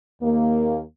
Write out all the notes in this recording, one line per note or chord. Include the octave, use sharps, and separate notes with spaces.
D#2 A#3